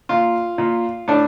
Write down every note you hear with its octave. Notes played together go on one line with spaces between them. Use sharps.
A#2 F4
A#2
A2 D4